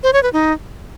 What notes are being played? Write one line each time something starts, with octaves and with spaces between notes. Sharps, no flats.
C5
C#5
B4
D#4